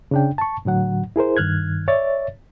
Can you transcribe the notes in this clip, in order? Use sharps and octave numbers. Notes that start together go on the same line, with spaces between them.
C#3 D4 G5
A5 C#6
A2 D3 F#3 F#5
E4 G#4 A#4 C5
G2 D#3 F6 F#6 G#6
C#5 D5 E5 A6